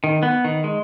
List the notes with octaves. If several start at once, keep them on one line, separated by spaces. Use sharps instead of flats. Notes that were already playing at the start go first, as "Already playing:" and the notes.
D#3
B3
D#3
G#3